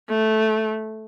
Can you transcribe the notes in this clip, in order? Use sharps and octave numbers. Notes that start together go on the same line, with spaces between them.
A3